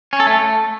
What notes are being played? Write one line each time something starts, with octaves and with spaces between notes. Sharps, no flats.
C#4
A4
A3